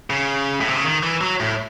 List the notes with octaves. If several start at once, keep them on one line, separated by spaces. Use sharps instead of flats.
C#3
A2
C3
C#3
D#3
E3
F#3
A2